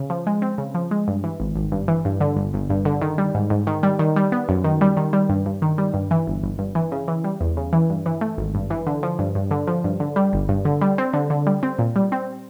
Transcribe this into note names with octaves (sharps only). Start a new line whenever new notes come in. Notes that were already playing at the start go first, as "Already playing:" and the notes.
Already playing: C#3
F3
G#3
C4
C#3
F3
G#3
G2
E3
G#1
G#1
G2
E3
G2
D3
G1
G1
G2
D3
D#3
G3
G#2
G#2
D#3
G3
D#3
G3
B3
F#2
D#3
G3
D#3
G3
G2
G2
D#3
G3
G2
E3
G1
G1
G2
E3
C#3
E3
G3
E2
C#3
E3
G2
E3
A3
G#1
G2
E3
D3
F3
G2
G2
D3
F3
G2
D3
G3
G1
G2
D3
G3
C4
D3
D3
G3
C4
A#2
G3
C4